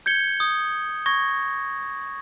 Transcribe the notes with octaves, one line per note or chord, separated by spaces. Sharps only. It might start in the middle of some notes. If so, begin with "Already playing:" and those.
G6 G#6 C#7 G7
D#6
C#6 G#6 A#6